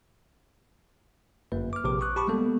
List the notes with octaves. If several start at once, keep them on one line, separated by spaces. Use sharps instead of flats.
G1 F#2 A#3 B4
D6 F6
A#1 C3 G4 B4 D6
C#6 D#6 F#6
G4 A5 B5 C#6 D6
G3 G#3 A#3 B3 A4